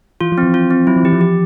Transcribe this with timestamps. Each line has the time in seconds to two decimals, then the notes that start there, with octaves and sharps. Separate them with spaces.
0.21 E3 F4
0.32 F3
0.38 C4
0.43 E3
0.54 F4
0.71 C4
0.87 F#3 E4
0.96 F3
1.04 E3 G4
1.13 F3
1.21 G4